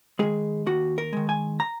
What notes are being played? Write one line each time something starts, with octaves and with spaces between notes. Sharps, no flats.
D#3 G#3 G#4
D#2 F#4
A#4
D#3 G#3
G#5
A#5